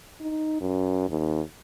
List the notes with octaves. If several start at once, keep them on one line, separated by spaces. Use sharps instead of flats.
D#4
F#2
D#2